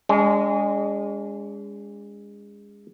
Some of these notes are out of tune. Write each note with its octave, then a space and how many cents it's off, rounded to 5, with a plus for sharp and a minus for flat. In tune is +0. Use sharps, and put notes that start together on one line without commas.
G#3 -25 C#4 +45